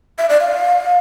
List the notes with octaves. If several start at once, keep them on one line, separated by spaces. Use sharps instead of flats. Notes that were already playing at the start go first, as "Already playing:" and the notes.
E5
D5
F5